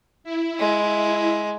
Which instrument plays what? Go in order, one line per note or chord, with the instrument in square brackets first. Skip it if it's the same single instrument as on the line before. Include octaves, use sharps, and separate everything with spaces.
[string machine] E4
[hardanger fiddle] G#3